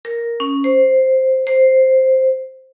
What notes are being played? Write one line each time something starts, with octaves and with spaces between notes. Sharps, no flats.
A#4
C#4
C5
C5